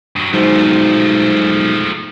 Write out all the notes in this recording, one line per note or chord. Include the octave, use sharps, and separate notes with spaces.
G2 F#3
B1 G#2 F3 F#3 A3 C5